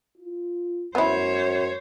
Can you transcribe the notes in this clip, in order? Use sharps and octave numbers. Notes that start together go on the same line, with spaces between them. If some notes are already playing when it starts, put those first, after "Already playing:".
F4
F#2 B3 E4 C5 C#5